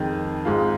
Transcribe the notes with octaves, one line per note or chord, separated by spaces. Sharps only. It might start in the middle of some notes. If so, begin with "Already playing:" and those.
Already playing: F2 D#3 G#3
G#1 G#2 G#3 F4